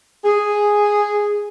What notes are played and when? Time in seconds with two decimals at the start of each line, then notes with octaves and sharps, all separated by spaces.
0.25 G#4